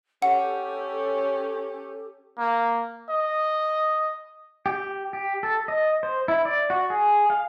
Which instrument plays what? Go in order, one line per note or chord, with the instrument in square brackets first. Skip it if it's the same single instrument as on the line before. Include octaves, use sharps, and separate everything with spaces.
[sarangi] C#4 [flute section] G4 A4 [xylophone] F#5
[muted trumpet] A#3
D#5
[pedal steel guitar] G4
G4
A4
D#5
C5
E4
D5
F#4
G#4
F5